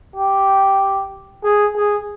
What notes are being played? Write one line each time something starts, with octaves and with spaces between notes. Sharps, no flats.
G4
G#4
G#4